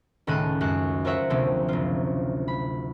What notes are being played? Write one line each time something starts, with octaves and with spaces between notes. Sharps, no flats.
C#2 A2 D#3 A4 F#6 D#7
F#2 G#3 F#4 F#6
F4 A#4 C5 C#5 E5 F#5
D2 C3 F3 A#3 C4
F#1 F4
B5